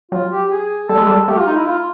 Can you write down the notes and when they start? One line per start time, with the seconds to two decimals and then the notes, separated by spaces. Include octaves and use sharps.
0.12 F#3 F4
0.30 G4
0.50 G#4
0.89 G3 A4
0.98 G#3
1.07 G3 A4
1.28 A3 G4
1.37 F4
1.47 D#4
1.56 E4
1.66 F4